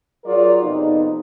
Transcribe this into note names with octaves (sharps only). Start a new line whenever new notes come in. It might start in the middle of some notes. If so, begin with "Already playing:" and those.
F#3 F4 G#4 A#4 D5
F2 C3 B3 D#4